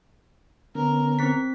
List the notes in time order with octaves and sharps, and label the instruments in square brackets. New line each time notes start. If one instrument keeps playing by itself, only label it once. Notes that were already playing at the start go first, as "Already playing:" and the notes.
[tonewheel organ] D3 B3 C#4 [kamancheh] A#4
[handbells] C4 B6